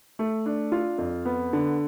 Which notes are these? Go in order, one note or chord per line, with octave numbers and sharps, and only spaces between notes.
A3
D4
F4
F2
B3
D3